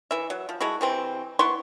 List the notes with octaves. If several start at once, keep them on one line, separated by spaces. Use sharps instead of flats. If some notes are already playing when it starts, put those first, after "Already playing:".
E3 E5
F#3
F3
G#3 A3 E4 F#4
C3 E3 C4
B3 E4 C6 C#6